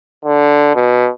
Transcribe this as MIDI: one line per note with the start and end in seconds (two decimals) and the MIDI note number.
0.25 0.74 50
0.75 1.09 47